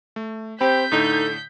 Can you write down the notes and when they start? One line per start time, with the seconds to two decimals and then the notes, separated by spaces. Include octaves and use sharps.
0.16 A3
0.61 C4 G4 C5 B5 G6 B6
0.92 A2 D3 D#4 A4